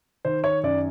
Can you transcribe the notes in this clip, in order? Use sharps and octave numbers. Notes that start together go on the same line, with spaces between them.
D#3 C5
C#5
F#2 D5